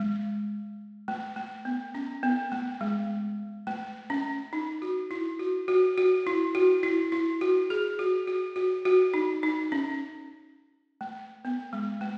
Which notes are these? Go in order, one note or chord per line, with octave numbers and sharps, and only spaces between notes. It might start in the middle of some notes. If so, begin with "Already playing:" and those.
Already playing: G#3
A3
A3
B3
C#4
B3
A3
G#3
A3
C#4
D#4
F#4
E4
F#4
F#4
F#4
E4
F#4
E4
E4
F#4
G#4
F#4
F#4
F#4
F#4
D#4
D#4
C#4
A3
B3
G#3
A3